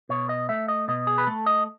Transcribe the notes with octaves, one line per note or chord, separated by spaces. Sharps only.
B2 C#5
D#5
A3 E5
D#5
B2 D#5
G#4
B4
A3 A4
D#5